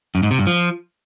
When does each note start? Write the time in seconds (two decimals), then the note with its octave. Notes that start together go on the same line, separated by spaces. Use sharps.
0.15 F#2
0.23 G#2
0.31 C3
0.39 G2
0.47 F3